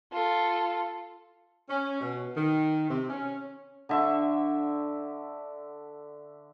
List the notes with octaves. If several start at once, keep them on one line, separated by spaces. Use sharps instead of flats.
F4 A4
C#4
B2
D#3
C3
C#4
D3 E5 C#6